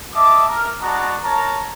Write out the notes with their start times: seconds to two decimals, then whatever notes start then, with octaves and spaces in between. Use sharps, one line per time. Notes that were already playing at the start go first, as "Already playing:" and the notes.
0.15 D#5 E5 A5 D6
0.49 A#4
0.81 G#3 B3 D4 F#4 A5 A#5
1.24 A#4 C#5 A5 A#5